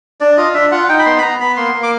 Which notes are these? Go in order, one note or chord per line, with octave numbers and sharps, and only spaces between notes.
D4 D5
F4 D#5
D4 E5
F4 F#5
D#4 G5
B5
B3 C6
B5
B3 A#5
B3 B5
A#3 C6
A#3
D6